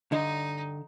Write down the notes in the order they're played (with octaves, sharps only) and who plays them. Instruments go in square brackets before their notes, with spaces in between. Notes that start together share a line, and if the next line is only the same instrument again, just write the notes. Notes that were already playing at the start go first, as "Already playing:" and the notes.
[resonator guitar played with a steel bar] G2 D#5 [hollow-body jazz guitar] D3 [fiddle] D#4